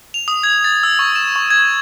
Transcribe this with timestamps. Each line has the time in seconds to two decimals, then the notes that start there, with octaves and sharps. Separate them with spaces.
0.14 F7
0.28 D#6
0.43 G#6
0.64 A6
0.83 E6
0.99 C#6
1.16 E7
1.36 C#6
1.51 G#6